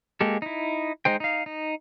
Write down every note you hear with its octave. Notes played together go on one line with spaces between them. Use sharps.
G#3 A#3 G4 A4
D#4 E4
G#3 D#4 C5 G5
D#4 F5
D#4